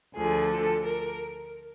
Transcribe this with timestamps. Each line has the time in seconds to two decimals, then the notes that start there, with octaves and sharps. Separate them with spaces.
0.16 D2 D3 F3 G#4
0.52 A4
0.86 A#4